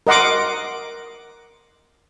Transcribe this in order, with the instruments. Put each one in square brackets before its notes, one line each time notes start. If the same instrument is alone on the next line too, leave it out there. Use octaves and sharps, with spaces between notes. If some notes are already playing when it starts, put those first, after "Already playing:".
[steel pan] A#4 D#5 F#5 C6 D6